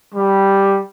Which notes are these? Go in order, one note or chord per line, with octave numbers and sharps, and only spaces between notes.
G3